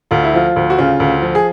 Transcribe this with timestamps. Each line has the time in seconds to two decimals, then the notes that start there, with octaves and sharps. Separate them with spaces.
0.11 D2 F4
0.24 E4
0.33 F3 F4
0.56 D2
0.70 F#4
0.79 C#3 F4
1.00 D2
1.22 F3
1.35 G#4